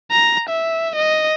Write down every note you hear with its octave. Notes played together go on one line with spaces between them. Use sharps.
A#5
E5
D#5